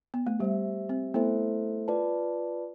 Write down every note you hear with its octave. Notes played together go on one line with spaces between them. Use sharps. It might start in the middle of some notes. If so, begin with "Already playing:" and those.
B3
A3
G3 G4 C5 E5
C4
A3 B3 E4 A4 C5 E5
F4 B4 D5 A5